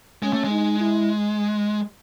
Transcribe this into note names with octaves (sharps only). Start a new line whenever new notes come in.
G#3 C#4
A3
G#3
D#4
E4